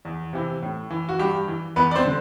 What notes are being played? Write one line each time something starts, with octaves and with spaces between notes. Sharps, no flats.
E2
C3 E3
A2
E3
F#4
G2 G4
E3
E2 B3 B4
D5
C4 C5
D3